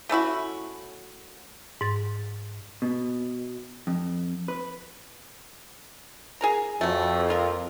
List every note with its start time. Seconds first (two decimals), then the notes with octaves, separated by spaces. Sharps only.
0.09 A3 C#4 E4 F#4
1.81 G#2 A6
2.82 B2
3.87 F2
4.48 B4
6.41 G#4 A#4 A#5
6.81 F2 F#3 A3
7.29 A#3 F4 A#4